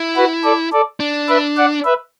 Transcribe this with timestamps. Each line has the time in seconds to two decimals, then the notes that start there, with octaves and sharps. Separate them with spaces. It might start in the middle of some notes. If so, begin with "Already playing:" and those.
Already playing: E4
0.16 F#4 B4
0.44 A4 D5
0.73 A4 D5
1.00 D4
1.29 B4 E5
1.57 D5 F#5
1.84 B4 E5